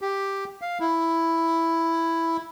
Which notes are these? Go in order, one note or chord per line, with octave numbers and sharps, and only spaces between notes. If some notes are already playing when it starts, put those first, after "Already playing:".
G4
F5
E4